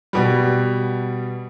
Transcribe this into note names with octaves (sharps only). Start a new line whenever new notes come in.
B2 G3